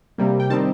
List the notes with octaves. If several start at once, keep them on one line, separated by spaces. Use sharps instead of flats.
C3 G3 A#3
G5
D#3 G3 C4 D#4 A5